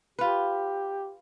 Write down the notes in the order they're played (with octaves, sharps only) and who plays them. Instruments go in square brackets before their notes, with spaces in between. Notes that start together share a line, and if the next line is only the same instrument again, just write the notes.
[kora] F4 B4 [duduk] G4